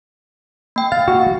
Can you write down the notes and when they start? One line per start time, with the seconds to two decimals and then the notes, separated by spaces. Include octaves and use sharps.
0.76 A#3 G5
0.92 F5 A6
1.08 F#4